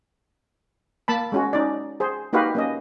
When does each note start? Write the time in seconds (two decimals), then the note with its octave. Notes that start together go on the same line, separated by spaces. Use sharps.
1.08 A#3 A5 B5
1.32 G#3 C#4 F#4
1.53 C#4 D#4 D5
2.00 G#4 C5
2.33 A#3 D#4 F#4 G4 B4 F5
2.55 A#3 C#4 D#5